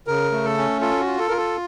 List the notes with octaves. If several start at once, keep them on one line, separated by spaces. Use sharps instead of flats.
C#3 A#4
A3
A4
C#4
F4 A4
F#4
F4
A4
F4 A#4
A4